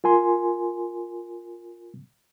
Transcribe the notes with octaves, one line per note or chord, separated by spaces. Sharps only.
F4 A#4 G#5 C6